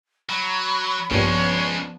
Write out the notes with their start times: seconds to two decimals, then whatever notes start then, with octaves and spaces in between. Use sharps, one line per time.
0.29 F#3 B5
1.11 A#1 G2 C#3 F3 G#3 B3 D4 C#5